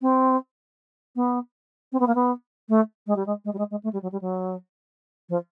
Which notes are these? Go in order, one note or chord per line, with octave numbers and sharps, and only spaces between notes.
C4
B3
C4
B3
A#3
B3
A3
G#3
G3
G#3
G#3
G3
G#3
G#3
A3
G3
F#3
G3
F#3
F3